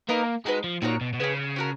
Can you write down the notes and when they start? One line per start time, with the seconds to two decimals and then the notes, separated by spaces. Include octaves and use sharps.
0.08 A#3 B3 D#4 A#4 D#5
0.45 G#3 D#4 F#4 B4
0.64 F3
0.82 A#2 D#4 F#4 A#4 C#5
1.01 B2
1.13 B2
1.19 C#3 C#4 G#4 B4
1.56 C#4 F#4 A#4